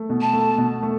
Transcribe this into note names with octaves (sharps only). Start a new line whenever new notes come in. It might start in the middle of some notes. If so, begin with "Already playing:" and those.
Already playing: A3
B2
A5
A3
B2
A3